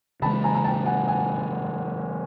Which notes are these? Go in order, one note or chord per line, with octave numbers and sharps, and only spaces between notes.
C#3 E3 G#3 A5 B5
G#5 A#5
A#5
G5 A5
F#5 G#5
F#5 G#5